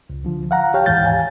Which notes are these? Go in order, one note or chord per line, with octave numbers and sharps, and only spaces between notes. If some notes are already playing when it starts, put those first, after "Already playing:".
C#2
D3 F3
F5 F#5 A#5
G4 C#5 F5 G5 A5
D#2 G#2 E3 F5 G6 A6
F5 G#5